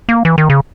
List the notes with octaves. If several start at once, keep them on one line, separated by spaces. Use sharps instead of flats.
A#3
E3
D#3
C#3